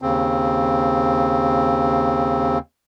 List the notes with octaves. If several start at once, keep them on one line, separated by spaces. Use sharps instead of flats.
D#2 C#3 C4